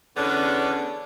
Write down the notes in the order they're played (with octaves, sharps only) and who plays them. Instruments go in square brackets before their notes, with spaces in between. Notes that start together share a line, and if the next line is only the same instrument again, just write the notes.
[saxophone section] E2 D3 B3 C#4 D4